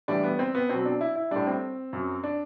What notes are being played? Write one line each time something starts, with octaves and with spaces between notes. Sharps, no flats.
A2 E3 G3 D4
B3
C4
B3
B2 F#3 C4
D4
E4
E4
A2 G3 D4
C4
F#2 F#3
D4